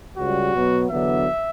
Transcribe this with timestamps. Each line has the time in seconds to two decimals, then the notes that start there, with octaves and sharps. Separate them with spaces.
0.16 C#2 C#3 G3 F#4
0.53 B2 F#3 B3
0.90 E2 D3 F#3 B3 D4 E5